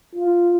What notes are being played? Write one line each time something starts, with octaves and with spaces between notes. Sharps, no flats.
F4